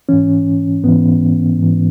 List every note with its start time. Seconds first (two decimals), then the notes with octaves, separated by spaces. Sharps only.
0.09 G#2 E3 C#4
0.84 G#2 E3 B3
1.59 G#2 E3